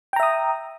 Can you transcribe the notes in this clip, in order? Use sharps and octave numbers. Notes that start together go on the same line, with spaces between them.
E5 G5 A#5 D#6